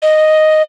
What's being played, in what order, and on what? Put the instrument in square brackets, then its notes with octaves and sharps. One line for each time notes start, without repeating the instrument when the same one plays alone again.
[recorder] D#5